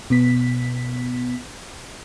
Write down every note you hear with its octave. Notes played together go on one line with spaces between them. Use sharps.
B2 B3 B6